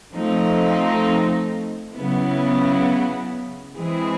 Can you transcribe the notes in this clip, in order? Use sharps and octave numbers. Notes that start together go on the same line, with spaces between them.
F3 A3 C4 D#4
C#3 F#3 B3 E4
E3 G#3 C4 E4 G#4